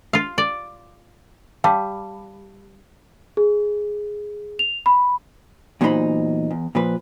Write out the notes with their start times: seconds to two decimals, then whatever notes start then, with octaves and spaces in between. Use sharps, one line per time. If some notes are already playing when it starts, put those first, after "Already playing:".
0.13 F4 F5
0.38 D5
1.64 G3 F5 A5
3.37 G#4
4.59 F7
4.86 B5
5.81 E2 A#2 F#3 D#4 C5 B5
6.51 E2
6.75 A#2 F3 B4